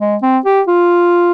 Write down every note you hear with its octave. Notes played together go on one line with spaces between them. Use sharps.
G#3
C4
G4
F4